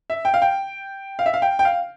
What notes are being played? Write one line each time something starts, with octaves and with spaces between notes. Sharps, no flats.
E5
G5
F5
G5
F5
E5
F5
G5
G5
F5